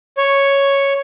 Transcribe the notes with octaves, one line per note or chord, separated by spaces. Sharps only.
C#5